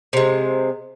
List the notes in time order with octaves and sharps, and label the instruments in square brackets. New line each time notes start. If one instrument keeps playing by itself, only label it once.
[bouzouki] C3 G#3